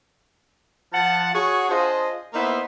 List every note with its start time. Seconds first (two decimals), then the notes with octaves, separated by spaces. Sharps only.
0.92 F3 F#5 A5
1.34 F#4 G#4 C#5
1.69 D4 F4 G#4 C5 D#5
2.34 A#3 B3 D#4 E4 C5 E5